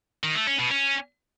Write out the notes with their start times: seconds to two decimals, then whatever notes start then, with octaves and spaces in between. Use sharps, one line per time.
0.24 D#3
0.35 A3
0.47 C#4
0.59 B2
0.71 C#4